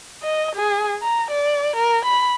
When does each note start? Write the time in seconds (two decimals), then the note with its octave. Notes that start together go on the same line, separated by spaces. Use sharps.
0.23 D#5
0.55 G#4
1.02 A#5
1.31 D5
1.76 A#4
2.05 B5